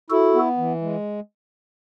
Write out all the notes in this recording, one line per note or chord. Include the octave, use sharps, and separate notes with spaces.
E4 F#4 A4
B3
E3
G#3